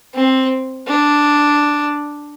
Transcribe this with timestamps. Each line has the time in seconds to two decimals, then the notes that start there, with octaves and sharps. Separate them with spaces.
0.14 C4
0.87 D4